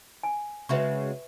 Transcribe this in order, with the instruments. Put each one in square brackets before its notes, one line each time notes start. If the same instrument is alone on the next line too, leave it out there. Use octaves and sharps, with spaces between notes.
[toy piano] G#5
[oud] C#3 G#3 F#4 [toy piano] B4 E5 C#6